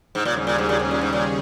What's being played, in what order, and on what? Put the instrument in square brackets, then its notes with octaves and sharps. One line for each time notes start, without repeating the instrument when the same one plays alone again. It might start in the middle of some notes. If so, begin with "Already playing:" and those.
[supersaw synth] D#2 C#3 G3 C#4 G#4 [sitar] G#2
[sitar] A#2
G#2
A#2
G#2
A#2
G#2
A#2
G#2
A#2